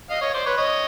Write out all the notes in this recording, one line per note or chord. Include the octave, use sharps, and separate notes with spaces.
D#5 F5
C#5 D#5
C5 D5
B4 C#5
C#5 D#5